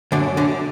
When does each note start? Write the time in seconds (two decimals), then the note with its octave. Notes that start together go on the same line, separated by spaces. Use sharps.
0.12 F#2 D3 D4
0.37 D3 D4